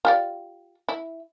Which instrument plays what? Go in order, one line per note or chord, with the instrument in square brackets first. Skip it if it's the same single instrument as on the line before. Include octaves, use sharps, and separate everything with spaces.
[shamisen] F4 G4 D5
E4